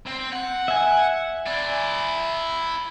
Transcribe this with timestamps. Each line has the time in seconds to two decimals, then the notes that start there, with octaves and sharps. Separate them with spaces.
0.06 C4
0.32 F#5
0.68 E5 G#5
1.47 E4 D5